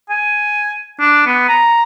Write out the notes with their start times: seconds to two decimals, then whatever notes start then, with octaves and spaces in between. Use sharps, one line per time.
0.10 G#5
1.00 D4
1.26 B3
1.49 A#5